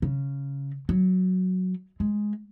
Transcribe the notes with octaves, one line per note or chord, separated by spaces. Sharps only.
C#3
F#3
G#3